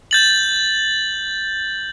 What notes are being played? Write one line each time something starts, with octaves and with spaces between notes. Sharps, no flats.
G6 A6 F#7